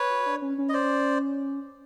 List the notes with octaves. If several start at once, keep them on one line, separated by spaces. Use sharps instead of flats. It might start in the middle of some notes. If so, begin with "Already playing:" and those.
Already playing: B4 C#5
F#4
D4
C#4
C#4
D#5
C5 D5